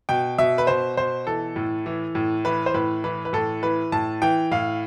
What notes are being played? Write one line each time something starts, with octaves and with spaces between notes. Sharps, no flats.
B2 G5
B2 E5
B4
B2 C5
B2 C5
E3 A4
A2
E3
A2
E3 B4
C5
A2 B4
E3 B4
B4
A2 A4
E3 B4
A2 A5
E3 G5
A2 F5